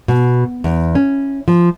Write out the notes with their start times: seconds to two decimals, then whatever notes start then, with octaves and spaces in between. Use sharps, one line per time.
0.08 B2
0.64 E2
0.95 C#4
1.48 F3